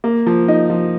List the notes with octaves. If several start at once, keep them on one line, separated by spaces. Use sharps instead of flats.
A#3
F3
D#4
F3